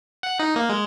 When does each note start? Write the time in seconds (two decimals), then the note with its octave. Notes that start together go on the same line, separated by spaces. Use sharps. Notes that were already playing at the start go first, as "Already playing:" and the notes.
0.23 F#5
0.40 D#4
0.56 A#3
0.69 G#3